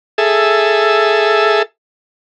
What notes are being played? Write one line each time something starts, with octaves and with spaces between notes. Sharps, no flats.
G#4 A4 E5